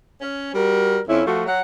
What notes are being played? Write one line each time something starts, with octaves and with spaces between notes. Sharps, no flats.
C#4
G3 F#4 A#4
F2 C#4 E4
F3 A3 F#4
F#3 F#5